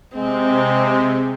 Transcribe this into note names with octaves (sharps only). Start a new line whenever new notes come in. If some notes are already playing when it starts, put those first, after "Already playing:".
C3 G#3 C4